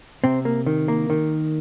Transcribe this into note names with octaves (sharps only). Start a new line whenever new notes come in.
C3 C4
A#3
D#3
A#3
D#3